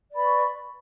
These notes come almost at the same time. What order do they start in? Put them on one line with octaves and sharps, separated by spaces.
D5 B4 B5 C#6